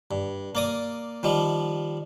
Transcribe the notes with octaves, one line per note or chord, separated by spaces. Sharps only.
G2
A#3 D5 D#6
D#3 F3 G3